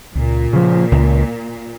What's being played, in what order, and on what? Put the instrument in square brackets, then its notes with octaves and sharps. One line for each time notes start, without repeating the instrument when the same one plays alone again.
[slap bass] C#2 [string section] A#2
[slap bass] C#3 F3
C#2